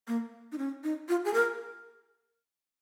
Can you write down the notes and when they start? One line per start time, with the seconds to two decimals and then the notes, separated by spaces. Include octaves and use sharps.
0.08 A#3
0.52 D#4
0.58 C#4
0.84 D#4
1.09 F4
1.25 G#4
1.34 A#4